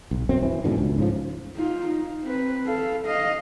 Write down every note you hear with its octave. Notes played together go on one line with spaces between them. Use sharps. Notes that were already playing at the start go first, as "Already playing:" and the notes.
B1
G1 F#2 C4
E3
G#2 B2 D3 E3
C#2
G#2 C#3 F3
D#4 F4
D#4
C4 B4
A4 F5
D#5 F5